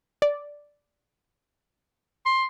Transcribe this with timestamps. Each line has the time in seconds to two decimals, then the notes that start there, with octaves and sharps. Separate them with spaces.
0.22 D5
2.26 C6